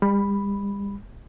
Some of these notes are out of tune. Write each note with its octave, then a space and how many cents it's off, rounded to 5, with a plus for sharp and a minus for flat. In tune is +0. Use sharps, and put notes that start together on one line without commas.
G3 +40 B5 +0